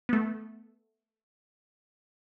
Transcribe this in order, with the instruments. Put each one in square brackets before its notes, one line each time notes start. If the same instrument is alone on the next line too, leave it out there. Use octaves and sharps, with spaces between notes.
[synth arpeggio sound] A3 B3